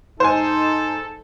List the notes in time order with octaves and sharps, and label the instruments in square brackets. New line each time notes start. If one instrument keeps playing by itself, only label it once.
[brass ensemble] G#2 D#4 [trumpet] A4 [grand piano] C5 G#5